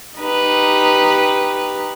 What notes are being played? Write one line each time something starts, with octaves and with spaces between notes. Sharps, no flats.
D#4 G4 B4